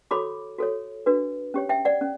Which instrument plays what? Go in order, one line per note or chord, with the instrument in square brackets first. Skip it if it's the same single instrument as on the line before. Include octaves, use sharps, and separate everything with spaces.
[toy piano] F#4 A4 C#5 B5 D6
F#4 A4 C#5
D4 F#4 B4
C#4 G4 C#5
E5 G5
D5 F#5
C#4